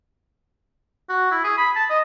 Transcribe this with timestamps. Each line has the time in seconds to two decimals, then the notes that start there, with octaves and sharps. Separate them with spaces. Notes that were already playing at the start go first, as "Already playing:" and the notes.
1.09 F#4
1.31 E4
1.44 G#4
1.57 B5
1.76 A5
1.90 D#5